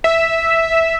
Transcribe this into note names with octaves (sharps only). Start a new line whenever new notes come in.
E5